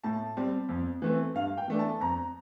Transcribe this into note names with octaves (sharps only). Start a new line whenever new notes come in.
A2 A5
G3 C4
F2
E3 A3 C4
G2 F5
G5
E3 A3 D4
A5
F2 A#5